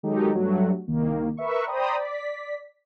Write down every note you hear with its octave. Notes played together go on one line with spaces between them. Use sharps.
D#3 F#3 G#3 D#4 G4 A4
G2 F#3 G3 A3 F#4
C2 D#3 A#3
A#4 B4 E5 C#6
C5 D5 G5 A#5 B5 D#6
D5 B6